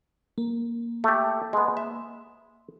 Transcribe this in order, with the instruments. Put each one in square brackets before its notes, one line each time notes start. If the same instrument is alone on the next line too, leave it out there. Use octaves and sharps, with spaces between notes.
[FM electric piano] A#3
[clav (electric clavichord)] A3 G4
G#3 B3
E5